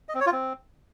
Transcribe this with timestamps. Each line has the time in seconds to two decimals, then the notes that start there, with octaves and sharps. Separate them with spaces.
0.09 D#5
0.15 C4
0.21 C#5
0.26 F4
0.32 C4